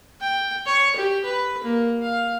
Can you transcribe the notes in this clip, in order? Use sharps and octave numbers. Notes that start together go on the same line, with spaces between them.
G5
C#5
G4
B4
A#3
F5